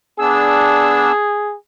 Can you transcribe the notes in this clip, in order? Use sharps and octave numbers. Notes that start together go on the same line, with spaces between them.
B3 D4 G#4 E6